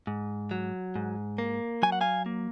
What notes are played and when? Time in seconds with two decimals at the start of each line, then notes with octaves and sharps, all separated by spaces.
0.07 G#2
0.51 F#3
0.95 G#2
1.38 A#3
1.83 F#3 G#5
1.92 F#5
2.01 F5 G#5
2.26 A#3